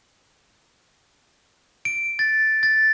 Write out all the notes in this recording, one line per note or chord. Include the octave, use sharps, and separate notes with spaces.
D7
A6
A6